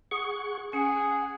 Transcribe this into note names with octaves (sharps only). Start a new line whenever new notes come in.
G#4 F#5 C#6
C#4 G#4 F#5